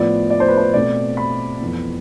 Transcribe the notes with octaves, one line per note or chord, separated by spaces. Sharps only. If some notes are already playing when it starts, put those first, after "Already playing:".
Already playing: A2 F3 B3 D5
D5
C5
B4
C5
B2 A3 C4 D5
B5
F2 E3 B3